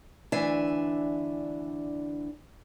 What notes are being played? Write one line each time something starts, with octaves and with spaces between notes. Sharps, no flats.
D2 E3 D4 D5 E5 G#5